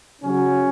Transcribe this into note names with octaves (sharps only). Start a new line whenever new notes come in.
C#3 F#3 C#4